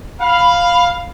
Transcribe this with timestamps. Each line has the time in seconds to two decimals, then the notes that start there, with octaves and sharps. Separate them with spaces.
0.20 F5 B5